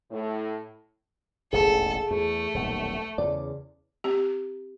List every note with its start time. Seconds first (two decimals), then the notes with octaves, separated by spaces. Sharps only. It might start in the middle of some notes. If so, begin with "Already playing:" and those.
0.11 A2
1.53 E1 A1 D#2 G#4 A4
2.11 E2 A3
2.54 D#1 B1 F2
3.18 E2 C#3 D5
4.04 C4 G4